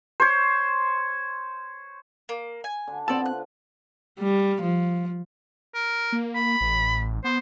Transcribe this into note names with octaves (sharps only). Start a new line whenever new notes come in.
C5 C#5
A#3
G#5
D3
B3 C4 F4 A4 C5 D5 A5
F#6
G3
F3
A#4
A#3
B5
A1
B3 C5